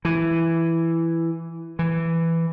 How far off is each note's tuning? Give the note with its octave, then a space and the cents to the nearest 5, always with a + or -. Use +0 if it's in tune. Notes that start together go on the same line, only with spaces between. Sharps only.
E3 +5
E3 +5